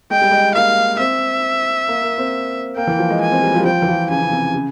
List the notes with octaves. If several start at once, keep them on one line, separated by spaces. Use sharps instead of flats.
G#3 G5
G3
G#3
A#3 F5
C4 E5
A#3
A#3
C4
A#3 G5
E3
F3
G#3
G#5
C4
G3
F3
G3
F3 G5
E3
F3
C#3 G#5
C#3
C3
C#3